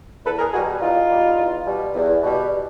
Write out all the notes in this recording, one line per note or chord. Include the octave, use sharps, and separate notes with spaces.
E2 A4 B4
G#4 A#4
B2 G3 F#4 G#4
E2 D#4 F4
B2 G3
E2
B2 G3
E2
B2 G3